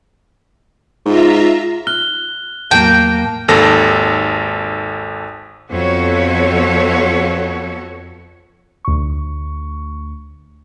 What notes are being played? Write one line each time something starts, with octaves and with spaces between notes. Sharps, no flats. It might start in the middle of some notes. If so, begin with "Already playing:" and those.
G#2 F4 E5 A#5
F6 F#6 G7
E2 A2 F#3 A#3 G5 A5
G#1 D#2 A4 A#6
F2 B3 F#4 A4 C#5
D2 C#6